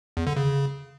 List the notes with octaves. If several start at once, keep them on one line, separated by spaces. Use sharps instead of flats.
E2
D3
C#3